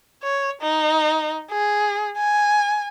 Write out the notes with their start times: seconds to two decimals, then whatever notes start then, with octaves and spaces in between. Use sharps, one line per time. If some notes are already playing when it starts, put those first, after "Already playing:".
0.23 C#5
0.61 D#4
1.51 G#4
2.18 G#5